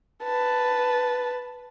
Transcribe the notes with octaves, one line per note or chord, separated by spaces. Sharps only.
B4 A5